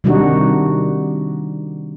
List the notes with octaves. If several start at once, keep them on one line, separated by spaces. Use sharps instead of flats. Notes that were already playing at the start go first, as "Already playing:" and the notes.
C3 D#3 G3 D4 D#4 F#4